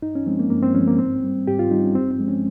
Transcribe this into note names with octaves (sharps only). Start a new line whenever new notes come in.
G2 D#4
C#4
F3 G#3 C4
A#3
G2 A#3
C4
F3 G#3 C#4
A#3
G#2 C4
G3
G#2 G4
F4
G3 D#4
C#4
G2 C4
C4
F3 G#3
C#4